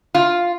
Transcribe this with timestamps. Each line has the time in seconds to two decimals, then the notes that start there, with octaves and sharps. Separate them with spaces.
0.15 F4